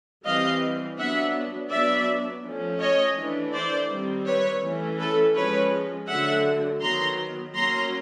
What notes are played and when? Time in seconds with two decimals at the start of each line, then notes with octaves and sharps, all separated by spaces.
0.24 E3 G3 C4 D#5 F5
0.97 F#3 B3 D4 E5 F#5
1.70 F#3 B3 D4 D5 E5
2.43 F3 A3 C#4
2.80 C#5 D#5
3.17 E3 A3 D4
3.52 C5 D5
3.89 D#3 G3 C4
4.26 B4 C#5
4.62 E3 A3 C#4
4.98 A4 B4
5.35 F3 G#3 C#4 B4 C#5
6.08 D3 F#3 A3 E5 F#5
6.81 D#3 F#3 B3 A#5 C6
7.54 F#3 A#3 C#4 A#5 C6